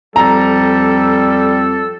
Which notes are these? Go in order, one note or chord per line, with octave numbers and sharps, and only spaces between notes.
F2 G3 A4 A#5